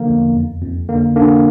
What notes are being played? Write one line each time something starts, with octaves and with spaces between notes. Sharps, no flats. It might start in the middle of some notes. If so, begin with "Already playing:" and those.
Already playing: D3 F3 A#3
E2
F2
F2
D3 A#3
D3 A#3 D4